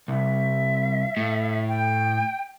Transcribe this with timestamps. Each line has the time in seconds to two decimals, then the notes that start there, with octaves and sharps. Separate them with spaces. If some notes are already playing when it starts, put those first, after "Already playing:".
0.08 C2 E5
1.17 A2
1.68 G5